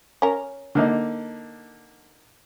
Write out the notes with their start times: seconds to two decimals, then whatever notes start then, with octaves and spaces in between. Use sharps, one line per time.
0.22 C#4 A#4
0.75 D3 A#3 D#4